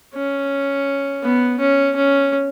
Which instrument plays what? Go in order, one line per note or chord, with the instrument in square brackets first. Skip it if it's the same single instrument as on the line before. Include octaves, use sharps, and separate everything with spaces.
[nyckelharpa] C#4
B3
C#4
C#4